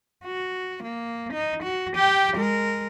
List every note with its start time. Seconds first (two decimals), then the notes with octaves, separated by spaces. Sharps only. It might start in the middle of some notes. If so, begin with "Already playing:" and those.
0.25 F#4
0.83 A#3
1.33 D#4
1.63 F#4
1.96 G4 G5
2.36 G#3 A#4